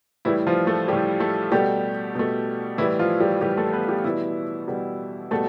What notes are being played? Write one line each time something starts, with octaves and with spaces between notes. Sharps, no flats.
A2 E3 G3 E4
F3 F4
A3 A4
A2 G3 G4
A3 A4
B2 G3 A3 G4
B2 A3
A2 E3 G3 E4
F3 F4
G3 G4
A2 E3 G3 G4
A3 A4
B3 B4
G3 G4
B2 E3 G3 E4
B2 G3
B2 G3 A3 A4